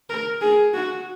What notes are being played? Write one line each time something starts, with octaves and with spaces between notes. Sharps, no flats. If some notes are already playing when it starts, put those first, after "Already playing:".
A#4
G#4
F#4